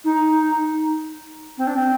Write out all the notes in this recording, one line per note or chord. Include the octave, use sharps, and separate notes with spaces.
D#4
C4
D4
C4